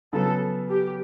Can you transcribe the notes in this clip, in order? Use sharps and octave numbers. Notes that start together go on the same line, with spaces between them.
C#3 F#3 B3 A4
G4